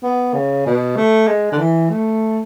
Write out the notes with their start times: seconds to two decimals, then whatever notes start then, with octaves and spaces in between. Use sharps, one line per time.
0.03 B3
0.34 C#3
0.66 B2
0.97 A3
1.27 G#3
1.52 D3
1.59 E3
1.90 A3